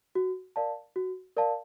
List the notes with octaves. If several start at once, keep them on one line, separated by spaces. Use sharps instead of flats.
F#4
A#4 D5 F5 A5
F#4
A#4 D5 F5 A5